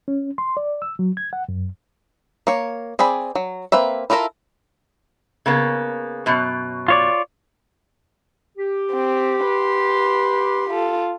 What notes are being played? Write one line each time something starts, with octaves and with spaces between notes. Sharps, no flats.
C#4
C6
D5
E6
F#3
G#6
F#5
F#2
A#3 C#5
C4 G#4 D5 B5
F#3
A#3 C4 B4 E5
E4 F4 A4 A#4 E5
C#3 A#3 B3
F#2 B2
F4 C#5 D5
G4
C4
B4 C6
F4 A4